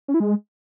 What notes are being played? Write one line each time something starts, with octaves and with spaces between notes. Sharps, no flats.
C#4
E4
G#3